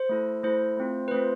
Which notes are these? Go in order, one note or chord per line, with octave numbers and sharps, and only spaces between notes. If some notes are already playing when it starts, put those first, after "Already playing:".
Already playing: C5
A3 E4 A4
A3 E4 A4 C5
A3 C4 F4
B4
A3 C4 F4 C5